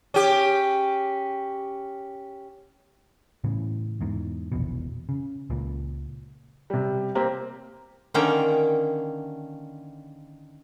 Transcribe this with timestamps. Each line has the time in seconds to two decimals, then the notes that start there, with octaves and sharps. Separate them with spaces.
0.14 C#4 G4
3.44 A2 C#3 E3
4.01 E2 G#2
4.52 F1 A#1 E2 B2
5.09 C#3
5.50 C#2 A#2
6.70 C3 G3
7.15 A#3 C4 G4
8.14 D3 D#3 A#3 C#4 G5 A#5